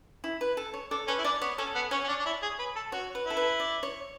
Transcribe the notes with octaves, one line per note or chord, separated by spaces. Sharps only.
E4
B4
A4
C#5
D4 A4
C#4 B4
E4
D4 D5
B3 C#5
C#4 A4
B3
C#4 C#5
C#4
D4
D4
E4
G#4
B4
A4
F#4 C#5
B4
E4 A4
B4
D5
C#5